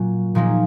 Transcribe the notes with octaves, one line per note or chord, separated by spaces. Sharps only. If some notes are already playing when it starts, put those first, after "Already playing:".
Already playing: A#2 F#3 C#4
A#2 F3 A#3 D#4 G#4